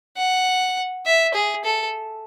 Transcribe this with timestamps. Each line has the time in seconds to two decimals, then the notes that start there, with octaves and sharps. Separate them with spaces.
0.17 F#5
1.06 E5
1.34 G#4
1.65 A4